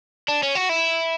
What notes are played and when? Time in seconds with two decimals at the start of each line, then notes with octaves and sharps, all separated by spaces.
0.28 D4
0.43 C#4
0.55 F#4
0.69 E4